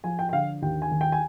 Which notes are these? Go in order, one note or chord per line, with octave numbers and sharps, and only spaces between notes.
F3 G#5
G5
G5
D3 F5
D#2 G5
G#5
D#3
G5
G#5